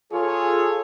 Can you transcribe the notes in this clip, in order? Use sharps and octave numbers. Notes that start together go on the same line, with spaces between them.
F4 G#4 A4 C#5